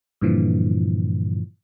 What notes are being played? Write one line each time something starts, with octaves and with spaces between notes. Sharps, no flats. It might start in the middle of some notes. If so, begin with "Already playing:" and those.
G2 A#2 D3 E3 F3